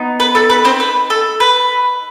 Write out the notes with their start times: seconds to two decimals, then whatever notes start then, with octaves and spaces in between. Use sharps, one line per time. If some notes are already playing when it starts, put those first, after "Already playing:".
Already playing: B3 D#4
0.20 B4
0.35 A4
0.50 B4
0.64 C4 C5
0.80 B4
1.10 A4
1.40 B4